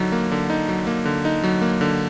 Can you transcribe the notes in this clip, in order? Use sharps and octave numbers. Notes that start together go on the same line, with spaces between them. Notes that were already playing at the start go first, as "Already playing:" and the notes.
Already playing: D3 F#3 D#4
A#3
D3
D#4
F#3
A#3
D3
D#4
F#3
A#3
D3